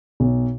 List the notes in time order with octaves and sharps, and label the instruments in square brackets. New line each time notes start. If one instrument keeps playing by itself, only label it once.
[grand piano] B1